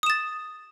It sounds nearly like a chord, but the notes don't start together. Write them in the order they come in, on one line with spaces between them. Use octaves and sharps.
D#6 E7 A6